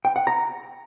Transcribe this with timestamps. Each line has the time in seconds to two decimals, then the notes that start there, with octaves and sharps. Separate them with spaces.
0.05 G5
0.16 F#5
0.27 A#5